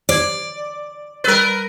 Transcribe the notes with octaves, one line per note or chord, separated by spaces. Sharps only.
C5 D5 G#6
G3 A#4 B4 E6 A6